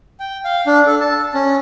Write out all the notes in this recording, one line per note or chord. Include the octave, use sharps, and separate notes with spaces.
G5
F5
D4
A4
A5
C#4